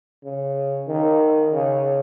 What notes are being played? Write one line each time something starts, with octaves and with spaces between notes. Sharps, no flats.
C#3
D#3
C#3